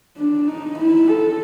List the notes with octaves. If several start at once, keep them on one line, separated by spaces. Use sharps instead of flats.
D4
D#4
E4
A4